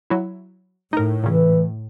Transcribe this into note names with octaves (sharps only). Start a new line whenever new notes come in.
F#3 E4
A2 D#4 A#4
A#2 C#3 E3